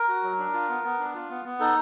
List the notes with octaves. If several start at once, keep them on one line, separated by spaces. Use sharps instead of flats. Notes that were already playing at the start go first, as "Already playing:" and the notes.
Already playing: A#4
F#4
F#3
D4
F4
B3
B3
D4
F4
B3
B3
D#4 A4